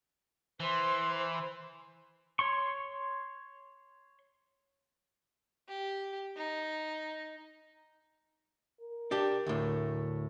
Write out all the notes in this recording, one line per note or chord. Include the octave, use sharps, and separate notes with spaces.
E3 C5
C#5 C6 C#6
G4
D#4
A#4
D4 G4
D2 A2